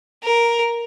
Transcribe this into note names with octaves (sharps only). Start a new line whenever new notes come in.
A#4